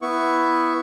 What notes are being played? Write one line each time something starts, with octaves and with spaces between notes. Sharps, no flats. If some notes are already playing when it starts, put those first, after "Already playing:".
B3 E4 C#6